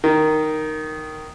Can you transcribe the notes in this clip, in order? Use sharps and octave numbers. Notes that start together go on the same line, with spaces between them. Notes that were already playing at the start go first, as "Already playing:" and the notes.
D#3